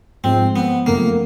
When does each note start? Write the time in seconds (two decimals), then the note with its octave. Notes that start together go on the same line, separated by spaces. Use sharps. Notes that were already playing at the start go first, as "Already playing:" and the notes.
0.24 G#2 F3 G#3 C4
0.56 B3
0.86 F#2 C#3 F3 A3 A#3